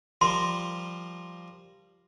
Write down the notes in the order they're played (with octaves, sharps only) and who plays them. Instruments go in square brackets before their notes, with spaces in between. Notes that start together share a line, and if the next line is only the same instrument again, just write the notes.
[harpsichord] F3 G3 A#4 [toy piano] C6